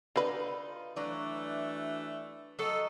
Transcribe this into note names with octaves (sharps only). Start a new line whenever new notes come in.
D3 D#4 F4 B4
E3 F#3 A3 D4 D5
F#3 A4 D#5